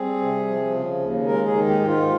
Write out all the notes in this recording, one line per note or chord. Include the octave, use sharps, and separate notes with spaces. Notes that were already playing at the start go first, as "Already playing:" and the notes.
Already playing: G3 C4 G#4
C3
F3
C#3
D#2
G#3 A#4
G#4
D#3
G4
G#2 G4
F4